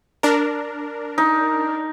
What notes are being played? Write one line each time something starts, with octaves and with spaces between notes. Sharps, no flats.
D4 A#4
D#4